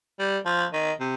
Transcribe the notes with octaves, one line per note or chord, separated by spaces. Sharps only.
G3
F3
D#3
C3